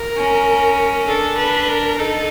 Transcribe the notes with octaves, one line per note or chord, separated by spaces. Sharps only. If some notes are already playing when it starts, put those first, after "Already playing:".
Already playing: A#4
C#4
D4 A4
B4
A#4
D#4 A4